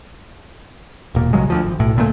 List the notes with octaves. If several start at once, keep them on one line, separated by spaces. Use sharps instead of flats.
E1 A#2
A#1 C#3 F#3 G#3
D2 F3
G#1
B1 A2
C#2 A#2 C#3 A3